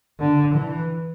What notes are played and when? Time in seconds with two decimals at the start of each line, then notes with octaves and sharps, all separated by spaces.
0.19 D3
0.55 E3